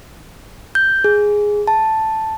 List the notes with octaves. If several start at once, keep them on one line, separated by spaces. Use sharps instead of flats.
G6
G#4
A5